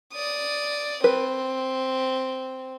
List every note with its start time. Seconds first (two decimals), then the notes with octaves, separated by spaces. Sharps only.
0.13 D5 D#6
1.04 C4 B4